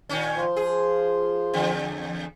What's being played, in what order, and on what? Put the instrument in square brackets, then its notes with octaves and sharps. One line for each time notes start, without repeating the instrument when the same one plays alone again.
[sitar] A#2 D#3 C#4
[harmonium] F3 F4 C5
[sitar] G#4
E2 D3